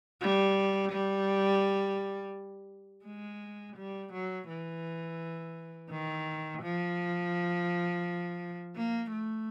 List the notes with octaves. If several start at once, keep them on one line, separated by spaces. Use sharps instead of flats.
G3
G3
G#3
G3
F#3
E3
D#3
F3
A#3
A3